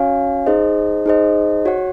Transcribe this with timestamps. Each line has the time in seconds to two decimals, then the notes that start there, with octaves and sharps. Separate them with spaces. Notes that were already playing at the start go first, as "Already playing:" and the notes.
Already playing: C#4 F#4 C#5 F5 G#5
0.46 D#4 G#4 C5 D#5
1.06 D#4 G#4 C5 D#5
1.66 F#4 C#5 F#5